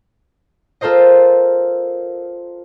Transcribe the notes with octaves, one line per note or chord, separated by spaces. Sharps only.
F4 A4 A#4 C5 D#5